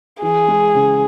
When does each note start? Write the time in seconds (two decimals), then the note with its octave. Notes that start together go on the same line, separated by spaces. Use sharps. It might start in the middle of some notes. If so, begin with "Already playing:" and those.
0.22 E3 G#4
0.48 G#3
0.75 C#3